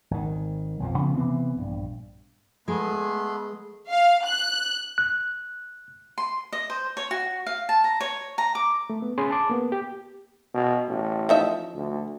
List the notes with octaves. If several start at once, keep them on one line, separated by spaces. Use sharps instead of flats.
G#1 D#3
B1 F2 F3
C#3 F3 B3
C3 E3 B3 C4
A#1 G2
G#3 A3 B3 C6
F5
F#6
F#6
C6
D#5
C5
C#5
F#4
F5
A5
A#5
C#5
A#5
D6
A3
B3
C#4 G#4 G#5 B5 C6
A5 D6
A#3 B3
G4
B2
A1
F3 D#4 E5
D2